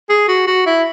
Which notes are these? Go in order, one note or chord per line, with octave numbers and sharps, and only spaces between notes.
G#4
F#4
F#4
E4